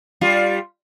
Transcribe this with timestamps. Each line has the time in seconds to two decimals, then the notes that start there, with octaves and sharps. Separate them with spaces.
0.21 G3 F4